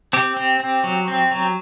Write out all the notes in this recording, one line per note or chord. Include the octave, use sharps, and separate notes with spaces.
C4 G4
C4
C4
F#3
C4
F#3